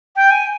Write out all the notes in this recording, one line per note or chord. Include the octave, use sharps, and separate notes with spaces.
G5
G#5